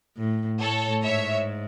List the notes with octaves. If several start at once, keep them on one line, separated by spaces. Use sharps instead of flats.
A2
A2 A4 C#5
G#2 C#5 E5